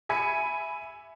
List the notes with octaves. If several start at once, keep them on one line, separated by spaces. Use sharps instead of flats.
E5 G#5 B5 G#6 B6 C#7